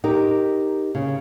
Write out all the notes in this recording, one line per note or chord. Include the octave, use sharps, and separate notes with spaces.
D#4 G4 A#4
C#3